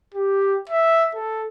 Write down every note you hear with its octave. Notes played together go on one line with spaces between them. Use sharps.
G4
E5
A4